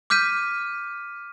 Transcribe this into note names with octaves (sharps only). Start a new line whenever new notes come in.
D6 F6 G6 B6 D#7